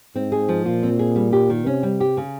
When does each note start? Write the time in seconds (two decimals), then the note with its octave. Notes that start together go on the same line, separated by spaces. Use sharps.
0.15 G#2 C4
0.32 G#4
0.49 F3
0.66 A#2 F4
0.83 C4
0.99 G#4
1.16 G3
1.32 G4
1.50 D#3
1.66 C3 C#4
1.83 G3
2.00 G4
2.17 C#3